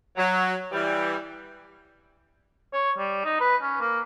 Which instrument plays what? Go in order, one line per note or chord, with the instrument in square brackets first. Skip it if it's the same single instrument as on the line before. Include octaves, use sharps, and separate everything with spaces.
[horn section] F#3
E3 G3
[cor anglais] C#5
G3
D#4
B4
C#4
A#3